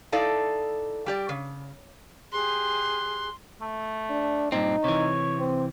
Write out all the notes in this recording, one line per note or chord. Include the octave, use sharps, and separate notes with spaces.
D#4 E4 A4 D5 F5
G3 G4 D5
C#3
G4 G#4 C6 F#6
A3
D4
G2 A#2 C4 D#4
C3 E3 C#5
C4